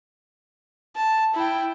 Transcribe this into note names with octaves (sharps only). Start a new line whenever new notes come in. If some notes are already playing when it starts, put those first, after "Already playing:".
A5
E4 G5